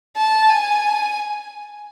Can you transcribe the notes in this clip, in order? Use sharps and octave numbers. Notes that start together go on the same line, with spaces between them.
A5
G#5